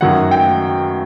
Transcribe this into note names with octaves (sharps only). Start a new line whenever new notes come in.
F#2 D#3 F#3 F#5
G5